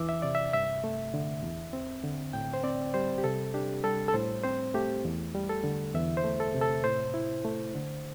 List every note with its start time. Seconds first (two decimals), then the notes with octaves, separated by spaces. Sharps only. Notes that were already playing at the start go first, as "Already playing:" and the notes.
Already playing: E2 E3 D6 E6
0.09 E5
0.22 C3 D5
0.35 E5
0.53 G2 E5
0.84 A3
1.14 D3
1.43 E2
1.73 C4
2.04 D3
2.33 A2 G5
2.54 C5
2.64 C4 D5
2.94 G3 C5
3.18 G4
3.24 C3 A4
3.54 D4 G4
3.84 G3 A4
4.08 A4
4.14 A2 C5
4.43 C4 C5
4.74 A3 G4
5.05 E2
5.35 G3
5.50 A4
5.64 D3
5.95 E2 E5
6.17 C5
6.24 A3
6.40 A4
6.54 C3
6.61 A4
6.84 A2 C5
7.14 E4
7.45 A3
7.75 D3